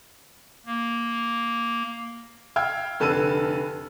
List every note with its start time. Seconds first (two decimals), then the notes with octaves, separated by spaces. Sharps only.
0.66 A#3
2.56 F5 G5 E6 F6 G#6
3.00 F1 D3 B4 A5 E6 D#7